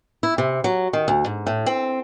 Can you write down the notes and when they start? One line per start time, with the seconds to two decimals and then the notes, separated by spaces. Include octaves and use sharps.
0.23 E4
0.38 C3
0.64 F#3
0.93 D#3
1.08 D2
1.26 G#2
1.47 A2
1.66 C4